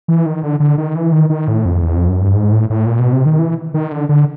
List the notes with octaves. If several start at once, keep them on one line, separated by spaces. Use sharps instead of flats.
E3
D#3
D3
D3
D#3
E3
D#3
D#3
A2
F2
E2
F2
F#2
G2
G#2
A2
A2
A#2
B2
C3
D#3
E3
D#3
D3
D3